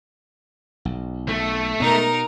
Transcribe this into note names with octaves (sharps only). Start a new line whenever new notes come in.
B1
A3
B2 B3 D#4 A#4